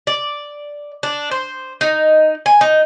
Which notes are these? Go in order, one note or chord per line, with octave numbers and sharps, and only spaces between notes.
D5
D4
C5
D#4
G#5
D#4